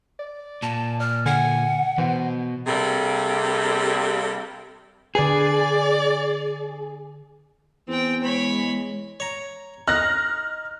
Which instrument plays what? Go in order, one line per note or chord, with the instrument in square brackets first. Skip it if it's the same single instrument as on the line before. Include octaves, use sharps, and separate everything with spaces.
[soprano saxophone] D5
[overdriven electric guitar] A#2 [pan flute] A5
[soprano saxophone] D5 [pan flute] F6
[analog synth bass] D3 [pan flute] F#5 [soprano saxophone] G#5
[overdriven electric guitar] B2 [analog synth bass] E3 [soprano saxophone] C5
[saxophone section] C3 G3 A#3 D4 G#4 A4
[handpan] D3 B4 [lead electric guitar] G#4 [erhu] D5
[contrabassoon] E2 [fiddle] C4 G5
[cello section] G#3 [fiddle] C#5 B5
[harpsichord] C#5 A#5
[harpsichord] D#4 [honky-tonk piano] F6 A#6 [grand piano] F#6